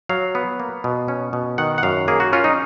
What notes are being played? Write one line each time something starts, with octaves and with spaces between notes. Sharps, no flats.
F#3 F5
B3
A#3
B2
C#4
B2
D#3 F#5
F#5
F#2 F5
A#3 G#4
F#4
C#4 F4
D#4